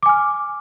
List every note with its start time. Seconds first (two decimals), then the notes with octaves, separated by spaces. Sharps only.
0.03 D6
0.06 G#5
0.09 F6